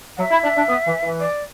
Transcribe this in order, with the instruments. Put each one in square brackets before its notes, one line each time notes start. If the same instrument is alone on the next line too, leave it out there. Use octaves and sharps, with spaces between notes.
[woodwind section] F#3 [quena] F#5
[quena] E5
[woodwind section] E4
D4
D4
B3
E3
E3
[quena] D5